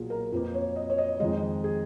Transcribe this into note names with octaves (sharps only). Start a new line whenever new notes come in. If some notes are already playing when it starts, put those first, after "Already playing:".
Already playing: B1 A#2 F#3 A#3 F4 F#4 G#4
A#4
F2 F3 A#3 B4
C#5
D#5
C#5
D#5
F2 D#3 G#3 D#5
G#4